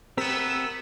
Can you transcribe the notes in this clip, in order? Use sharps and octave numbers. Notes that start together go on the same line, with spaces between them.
A3 B3 C4 G4 A#4 E6 B6 E7